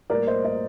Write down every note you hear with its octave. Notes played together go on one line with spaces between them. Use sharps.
A2 G3 A#3 A#4 D5
C5 D#5
C5 D#5